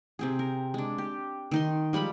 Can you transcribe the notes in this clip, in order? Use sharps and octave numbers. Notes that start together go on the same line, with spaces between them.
C3 C4 G#4
A#4
G#3 D4
G4
D#3 D#4 C6
F3 G3 G#3 B5